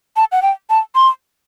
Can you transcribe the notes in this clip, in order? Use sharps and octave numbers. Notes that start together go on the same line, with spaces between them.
A5
F#5
G5
A5
C6